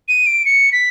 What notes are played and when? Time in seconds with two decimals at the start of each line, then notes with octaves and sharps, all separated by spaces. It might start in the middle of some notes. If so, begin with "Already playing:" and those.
0.08 D#7
0.26 D7
0.45 C#7
0.72 B6